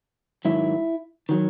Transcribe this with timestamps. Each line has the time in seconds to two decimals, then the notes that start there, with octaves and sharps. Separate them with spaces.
0.45 G#2 D#3 F#3 E4
1.29 D#3 F#3